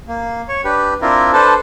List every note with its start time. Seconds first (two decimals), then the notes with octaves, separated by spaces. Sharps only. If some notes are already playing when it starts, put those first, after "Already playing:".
0.08 A#3
0.49 C#5
0.64 D4 G4 B4
1.02 C4 D4 E4 F4 A#4
1.33 D4 A4 B4 C5 A5